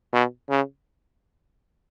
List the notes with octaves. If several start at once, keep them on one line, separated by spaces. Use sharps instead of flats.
B2
C#3